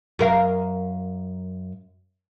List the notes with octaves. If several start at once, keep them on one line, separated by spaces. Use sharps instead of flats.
F#2 A#4 F5